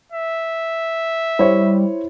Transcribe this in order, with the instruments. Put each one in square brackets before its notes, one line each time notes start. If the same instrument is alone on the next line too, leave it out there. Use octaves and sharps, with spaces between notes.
[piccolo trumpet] E5
[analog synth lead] G3 [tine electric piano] E4 [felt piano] C5 C#5